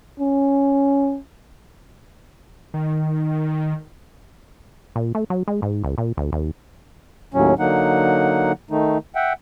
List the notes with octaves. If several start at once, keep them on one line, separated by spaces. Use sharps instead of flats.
C#4
D#3
A#2
A3
F#3
G#3
G#2
C#2
A#2
D2
D#2
D#2 A2 F#3 C#4
D3 F#3 A#3 D#4 F#5
D#3 A3 D#4
E5 F#5 G5